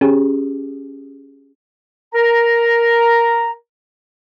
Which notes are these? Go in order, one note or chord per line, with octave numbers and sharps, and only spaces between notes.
C#4 G4 G#4
A#4 A#5